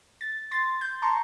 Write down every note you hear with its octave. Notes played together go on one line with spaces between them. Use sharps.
A6
C6 A6
G6
A5 A#5 C6 C#6